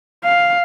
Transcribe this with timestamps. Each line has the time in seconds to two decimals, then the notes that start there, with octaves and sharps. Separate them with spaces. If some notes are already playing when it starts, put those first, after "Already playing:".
0.24 F5